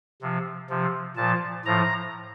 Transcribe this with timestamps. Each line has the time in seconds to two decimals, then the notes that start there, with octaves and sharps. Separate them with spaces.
0.22 C3 F3
0.70 C3 F3
1.17 A#2 F3 A5
1.65 A2 F3 A#5